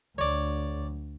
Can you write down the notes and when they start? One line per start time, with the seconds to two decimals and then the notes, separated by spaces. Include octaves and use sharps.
0.18 D2 C#5 D5